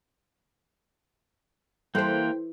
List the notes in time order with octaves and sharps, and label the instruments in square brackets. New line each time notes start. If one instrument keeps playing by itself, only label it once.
[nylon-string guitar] E3 [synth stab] G3 A4 C5 [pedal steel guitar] A#3 C6 F#6 [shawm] G5